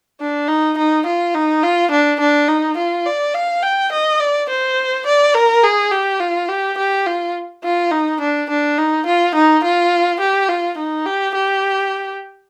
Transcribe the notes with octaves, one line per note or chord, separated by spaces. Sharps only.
D4
D#4
D#4
F4
D#4
F4
D4
D4
D#4
F4
D5
F5
G5
D#5
D5
C5
D5
A#4
G#4
G4
F4
G4
G4
F4
F4
D#4
D4
D4
D#4
F4
D#4
F4
G4
F4
D#4
G4
G4